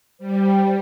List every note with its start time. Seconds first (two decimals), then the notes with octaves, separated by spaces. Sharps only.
0.19 G3 C5
0.44 G5